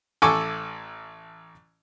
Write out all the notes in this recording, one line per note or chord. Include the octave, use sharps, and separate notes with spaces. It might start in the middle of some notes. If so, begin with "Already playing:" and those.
A1 A4 G#5 C#6 D6 E6